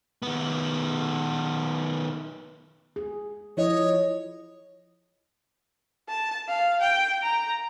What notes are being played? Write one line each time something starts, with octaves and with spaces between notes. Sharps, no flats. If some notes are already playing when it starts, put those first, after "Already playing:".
D#3 B3
G#4
F3 E4 C#5 D#5
A5
F5
G5
A#5